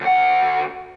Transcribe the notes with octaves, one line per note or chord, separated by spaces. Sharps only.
D2 F#5